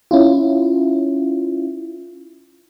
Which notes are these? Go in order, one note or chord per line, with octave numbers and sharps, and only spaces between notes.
C#4 E4 F4